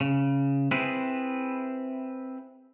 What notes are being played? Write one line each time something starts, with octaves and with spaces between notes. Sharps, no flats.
C#3
C4 E4 G#4 B4